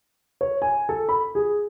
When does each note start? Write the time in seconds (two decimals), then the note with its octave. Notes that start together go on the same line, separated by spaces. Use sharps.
0.41 C#5
0.62 G#5
0.89 A4
1.09 B5
1.35 G#4